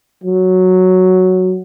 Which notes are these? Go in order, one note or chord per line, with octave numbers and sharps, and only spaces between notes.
F#3